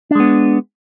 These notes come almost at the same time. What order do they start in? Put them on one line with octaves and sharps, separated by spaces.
D4 G#3 B3